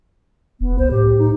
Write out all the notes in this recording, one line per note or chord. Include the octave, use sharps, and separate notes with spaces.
E1 B3
C2 C5
A2 G4
D#4